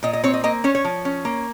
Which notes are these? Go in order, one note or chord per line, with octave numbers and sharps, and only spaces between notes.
A#2 D#5
D#5
C4 C#5
D#5
A#3 D#5
C#4 C#5
C#5
F3
C#4
A#3